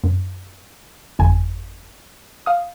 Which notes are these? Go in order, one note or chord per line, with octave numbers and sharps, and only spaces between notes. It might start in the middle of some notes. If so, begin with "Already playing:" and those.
F#2
G1 F2 G#5
F5 D#6